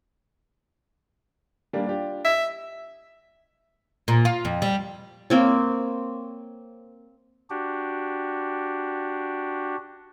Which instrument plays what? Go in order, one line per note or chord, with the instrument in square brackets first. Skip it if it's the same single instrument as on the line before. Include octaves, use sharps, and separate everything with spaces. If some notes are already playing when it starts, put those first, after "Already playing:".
[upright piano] G3 A#3 D4
D4 F4 G4
[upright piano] D#5 [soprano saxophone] E5
[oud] A#2
F4
F2
G3
[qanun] A#3 C4 C#5
[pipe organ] D4 F#4 G4